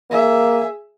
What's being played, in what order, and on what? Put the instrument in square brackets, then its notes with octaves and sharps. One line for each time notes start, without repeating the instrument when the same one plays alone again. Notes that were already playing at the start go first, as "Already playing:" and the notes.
[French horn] A#3 [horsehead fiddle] G#4 E5